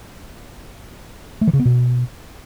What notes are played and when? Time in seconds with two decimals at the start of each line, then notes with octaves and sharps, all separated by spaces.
1.41 A3
1.47 E3
1.53 C#3
1.59 B3
1.65 B2